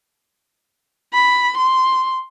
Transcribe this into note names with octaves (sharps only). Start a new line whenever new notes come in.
B5
C6